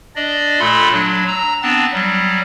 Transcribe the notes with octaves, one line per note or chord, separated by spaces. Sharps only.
D4 D5 D#5
A#2 A3 A4 B5 C6
F#3 D4
A#5 E6
B3 C4 D4 A5 A6
F#3 G3